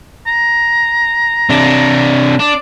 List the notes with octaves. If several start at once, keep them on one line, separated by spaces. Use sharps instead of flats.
A#5
C3 D4
D4 D5